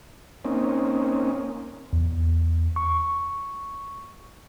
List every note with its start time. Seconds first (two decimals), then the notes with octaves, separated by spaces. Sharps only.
0.45 A#3 C4 C#4 D#4
1.93 E2
2.76 C#6